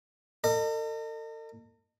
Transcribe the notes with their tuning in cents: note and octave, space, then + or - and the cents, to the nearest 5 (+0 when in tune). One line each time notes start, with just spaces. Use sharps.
A4 +45 D#5 -30